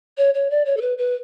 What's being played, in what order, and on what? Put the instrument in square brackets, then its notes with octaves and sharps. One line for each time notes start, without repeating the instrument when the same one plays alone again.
[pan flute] C#5
C#5
D5
C#5
A4
B4
B4